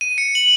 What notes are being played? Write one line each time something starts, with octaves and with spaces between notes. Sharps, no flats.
D#7
C#7
F#7